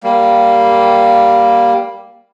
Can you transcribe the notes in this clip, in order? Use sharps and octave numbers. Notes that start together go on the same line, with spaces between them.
G3 A#3